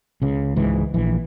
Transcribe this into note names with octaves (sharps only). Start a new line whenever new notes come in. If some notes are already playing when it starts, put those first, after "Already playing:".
C#2 C#3
C#2 G#2 E3
A#1 E3